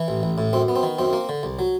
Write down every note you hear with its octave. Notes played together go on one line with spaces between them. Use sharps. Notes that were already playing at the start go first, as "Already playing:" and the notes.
Already playing: E3
A1
A1
A2
F#2 C4
B3
C4
D#3
F#2 C4
A#3
D3
C2
F#3